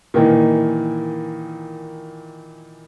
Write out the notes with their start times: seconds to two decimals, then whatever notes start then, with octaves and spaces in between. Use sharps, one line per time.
0.14 A#2 D#3 E3